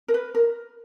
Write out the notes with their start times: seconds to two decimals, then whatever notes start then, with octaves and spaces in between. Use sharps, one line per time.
0.08 A#4
0.14 B4
0.35 A#4